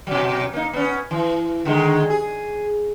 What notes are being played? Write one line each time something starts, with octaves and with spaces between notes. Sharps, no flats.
B2 F#3
A#3 D#4
B3 C#4
E3
D3 D#3 G#3
G#4